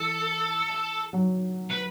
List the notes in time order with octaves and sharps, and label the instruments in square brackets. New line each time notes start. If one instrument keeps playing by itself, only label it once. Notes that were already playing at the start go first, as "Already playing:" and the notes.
Already playing: [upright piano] E3 [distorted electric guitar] A4
[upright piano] F#3
[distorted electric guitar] B4